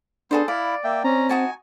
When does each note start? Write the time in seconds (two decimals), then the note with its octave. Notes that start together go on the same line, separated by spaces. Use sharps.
0.31 B3 D4 G#4 A4 C5
0.48 E4 D5 F5 B5
0.84 A#3 E5 G5
1.04 C4 C#4 A#5
1.29 D#4 F#4 G#5 A5